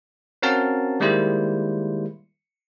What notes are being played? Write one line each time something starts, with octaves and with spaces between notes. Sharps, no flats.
C4 C#4 F#4 A#4 F5 A5
D#3 G3 G#3 A#3 E4 C5